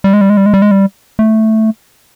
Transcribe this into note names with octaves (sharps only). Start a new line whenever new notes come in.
G3
G#3
G3
G#3
G3
G#3
G3
G#3
G3
A3